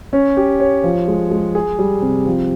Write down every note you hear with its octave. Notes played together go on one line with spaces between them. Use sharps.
C#4
G4
C#5
F3
G#3
G#3
G#4
G3
C3
F3